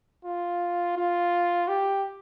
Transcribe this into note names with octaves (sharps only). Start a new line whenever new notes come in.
F4
F4
G4